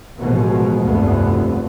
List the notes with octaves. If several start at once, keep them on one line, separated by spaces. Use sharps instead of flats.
A1 B2 D#3 F3 G#3
F1 D2 G2 B3